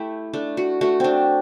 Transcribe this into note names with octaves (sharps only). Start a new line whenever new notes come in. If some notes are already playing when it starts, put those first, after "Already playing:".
Already playing: A3 E4 G4
A3 D4
F#4
A3 F#4
C4 D4